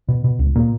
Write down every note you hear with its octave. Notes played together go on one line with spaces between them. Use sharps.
B2
B2
C#2
A#2 A#3